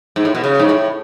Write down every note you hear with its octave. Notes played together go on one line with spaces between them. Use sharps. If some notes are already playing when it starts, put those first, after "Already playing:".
G#2
A2
B2
C#3
G#2
A2